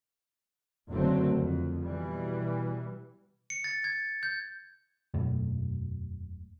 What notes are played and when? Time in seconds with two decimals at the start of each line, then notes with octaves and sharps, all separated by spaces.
0.89 F#1 D3 F#3 A3 C4
1.36 F2
1.84 B2 E3 G3
3.50 C#7
3.64 A6
3.84 G#6
4.23 G6
5.14 E1 F#2 B2 A3